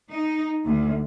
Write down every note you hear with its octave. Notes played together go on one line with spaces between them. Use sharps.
D#4
D2